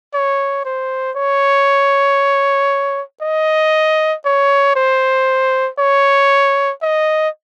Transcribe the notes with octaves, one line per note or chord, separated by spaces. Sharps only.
C#5
C5
C#5
D#5
C#5
C5
C#5
D#5